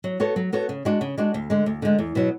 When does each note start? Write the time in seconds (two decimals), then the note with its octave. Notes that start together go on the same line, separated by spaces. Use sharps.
0.04 F#3
0.20 B3 F#4 A4 C#5
0.36 F#3
0.53 B3 F#4 A4 C#5
0.69 C#3
0.85 G#3 D4 F#4
1.01 C#3
1.18 G#3 D4 F#4
1.34 D2
1.50 D3 G#3
1.66 D2
1.82 D3 G#3
1.99 E2
2.15 B2 F#3